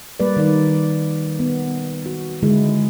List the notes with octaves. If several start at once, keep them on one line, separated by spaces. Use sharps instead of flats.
G3 A#3 B4 D5
D#3 D#4 D5
B3
F#4
D3 G#3 E4